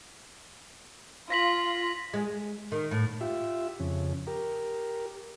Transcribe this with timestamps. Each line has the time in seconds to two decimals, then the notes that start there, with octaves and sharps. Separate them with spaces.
1.30 F4 A#6 B6 F#7
2.14 G#3
2.72 D#3
2.91 A2
3.21 F4 G4 E5
3.80 F2 C#3
4.27 G4 A#4